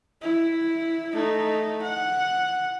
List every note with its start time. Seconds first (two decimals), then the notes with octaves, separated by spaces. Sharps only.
0.22 E4
1.13 A3 D#4
1.83 F#5